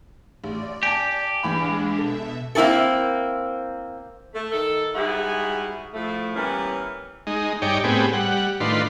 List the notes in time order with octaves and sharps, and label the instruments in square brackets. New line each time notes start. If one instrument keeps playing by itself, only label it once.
[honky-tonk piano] A1 [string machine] D5
[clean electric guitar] G4 [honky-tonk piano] G#5 A5
[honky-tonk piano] A#1 E3 B5 [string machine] G#3 D4
[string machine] B2 E5 [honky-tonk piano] A4
[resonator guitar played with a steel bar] A#3 C4 E4 G#4 A4
[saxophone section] A3
D#3 A4
G#2 G3 E4 F#4 G#4
A2 F3 A3
E3 G3 A#3 B3 C#4
[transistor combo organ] G#3 D#4
G2 D#4 C#5 D5 G5
A2 B3 C4 G4 G#4
G3 F#5
A2 D#3 D4 F4 B4 C6